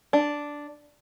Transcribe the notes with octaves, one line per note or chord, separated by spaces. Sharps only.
D4